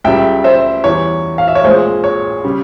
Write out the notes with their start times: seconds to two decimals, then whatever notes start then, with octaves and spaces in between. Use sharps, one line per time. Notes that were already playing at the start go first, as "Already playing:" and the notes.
0.04 C#2 C#3 G3 E5 G5
0.44 C5 E5
0.84 E2 E3 G3 C#5
1.38 F5
1.48 E5
1.55 C#5
1.64 A#1 A#2 G#3 C4 C5
2.04 C#5
2.44 C#3 G3